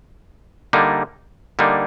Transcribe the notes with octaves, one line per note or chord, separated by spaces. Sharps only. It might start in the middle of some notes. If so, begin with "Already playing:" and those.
D3 G3 A#3 D#4
D3 G3 A#3 D#4